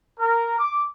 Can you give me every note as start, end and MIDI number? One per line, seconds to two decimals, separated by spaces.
0.19 0.56 70
0.58 0.85 86